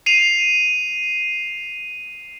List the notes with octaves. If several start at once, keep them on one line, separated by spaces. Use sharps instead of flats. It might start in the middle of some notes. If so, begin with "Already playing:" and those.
C7 D#7 F7